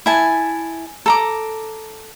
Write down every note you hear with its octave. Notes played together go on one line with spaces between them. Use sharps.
E4 G#5 A5
A4 A#5 D6